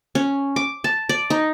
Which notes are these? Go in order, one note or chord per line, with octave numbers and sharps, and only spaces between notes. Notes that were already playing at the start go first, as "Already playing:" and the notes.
C#4
D6
A5
D5
D#4